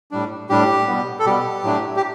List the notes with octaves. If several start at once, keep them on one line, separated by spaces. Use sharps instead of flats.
A2 G3 D4
A2 G3 D4 G4
B2 G3 B3
A4
B2 G3 B3 G4
A2 F#3 A3 D4
G4